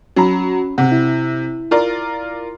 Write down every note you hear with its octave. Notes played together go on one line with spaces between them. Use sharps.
F#3 C#4 A#5 B5
C3 F#5
E4
F4 A#4 D5